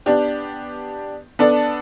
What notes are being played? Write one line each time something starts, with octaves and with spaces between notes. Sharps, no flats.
B3 D4 G4 D5
B3 D4 A4 D5